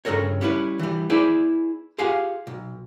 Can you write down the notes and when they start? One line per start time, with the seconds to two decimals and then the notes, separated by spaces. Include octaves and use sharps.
0.05 G2 C#3 E3 A4 A#4 C#5
0.41 G3 C#4 E4 B4
0.79 E3 G3
1.10 E4 G#4 B4 C5 D5
1.98 F4 G4 G#4 F5 F#5 G#5
2.47 B1